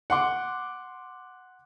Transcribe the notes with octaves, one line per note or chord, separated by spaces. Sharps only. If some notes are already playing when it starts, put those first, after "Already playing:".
F#5 C6 D6